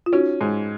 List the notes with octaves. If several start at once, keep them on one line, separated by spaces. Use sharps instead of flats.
F4
C#4 D#4 F#4
G#2